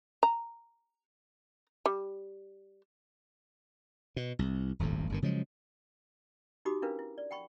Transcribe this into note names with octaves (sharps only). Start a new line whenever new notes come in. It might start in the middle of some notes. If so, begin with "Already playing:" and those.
A#5
G3
B2
C2
D#1 G#1 F2 A2
G1 G2 D#3
C#3 F3 F#3 G#3
D#4 F#4 G4 B5 D6 D#6
C#4 D4 E4 A#4 B4 F5
E4
D5
F#5 G5 B5 C#6